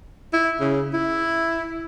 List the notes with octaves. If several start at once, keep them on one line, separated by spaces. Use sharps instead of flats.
E4
C#3
E4